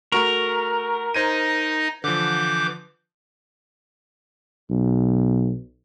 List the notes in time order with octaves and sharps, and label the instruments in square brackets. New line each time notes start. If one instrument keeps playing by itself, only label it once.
[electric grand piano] A3 F#4 C#6 [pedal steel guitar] A#4
[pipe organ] D#4 D#5 [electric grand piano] C5 G#6 D#7
[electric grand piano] D3 F3 [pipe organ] E3 D6 G6
[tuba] B1